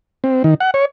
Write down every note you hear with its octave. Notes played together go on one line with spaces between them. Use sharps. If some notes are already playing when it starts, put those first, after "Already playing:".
C4
D#3
F#5
C#5